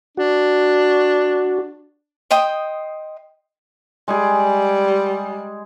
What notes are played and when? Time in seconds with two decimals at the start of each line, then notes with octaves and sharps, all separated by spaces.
0.17 D4 F#4
2.31 C5 D#5 G5 D#6
4.08 G3 G#3 G#4